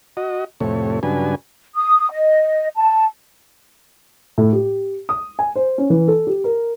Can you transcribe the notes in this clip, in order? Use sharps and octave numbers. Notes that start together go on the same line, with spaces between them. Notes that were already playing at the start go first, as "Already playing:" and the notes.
F#4 D#5
F2 A2 C3 A3 C#5
G2 C#3 F#3 D4 B4 G#5
D#6
D#5
A5
A2
G4
D#6
G#5
C5
C#4
E3
A4
G4
A#4